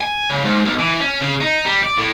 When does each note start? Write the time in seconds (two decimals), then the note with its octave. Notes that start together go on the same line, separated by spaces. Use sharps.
0.01 G#5
0.30 C#3
0.45 G#2
0.65 B1
0.79 E3
1.00 C#4
1.21 C#3
1.41 D#4
1.65 G3
1.83 D5
1.98 A2